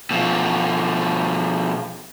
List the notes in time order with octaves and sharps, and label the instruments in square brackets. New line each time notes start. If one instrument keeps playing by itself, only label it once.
[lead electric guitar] B2 F3